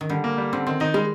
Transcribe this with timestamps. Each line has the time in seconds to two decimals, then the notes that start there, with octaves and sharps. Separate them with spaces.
0.01 D#3
0.10 D3 G3
0.24 A#3
0.38 G3
0.53 D3 C4
0.67 D#3 C4
0.80 D#3 D#4
0.94 G3 G#3